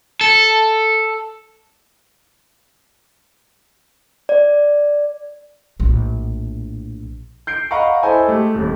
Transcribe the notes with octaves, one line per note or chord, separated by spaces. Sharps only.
A4
D5
A#1 A2
G6 C7 D7
D#5 F5 F#5 A#5 B5 C#6
E4 A4 C5 D#5 G#5 B5
G#3 A3 G4
D#1 D#2